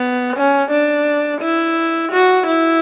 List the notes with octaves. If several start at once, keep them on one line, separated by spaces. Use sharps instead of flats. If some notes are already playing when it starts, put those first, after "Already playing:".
Already playing: B3
C#4
D4
E4
F#4
E4